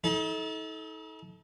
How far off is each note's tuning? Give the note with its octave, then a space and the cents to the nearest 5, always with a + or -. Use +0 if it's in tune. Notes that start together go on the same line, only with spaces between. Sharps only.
D#4 +40 A4 -20